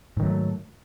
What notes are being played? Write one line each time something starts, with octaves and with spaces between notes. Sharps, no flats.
G#2 D#3 F#3 A3